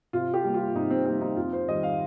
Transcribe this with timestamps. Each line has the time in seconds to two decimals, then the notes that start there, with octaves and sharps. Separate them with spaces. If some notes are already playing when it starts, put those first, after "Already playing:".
0.13 C3 F4
0.34 G4
0.45 G3 A#3
0.54 F4
0.75 C3 D#4
0.90 C4
1.05 G3 A#3 C4
1.21 D#4
1.37 F2 F4
1.53 C5
1.67 D#3 G3 D#5
1.83 F5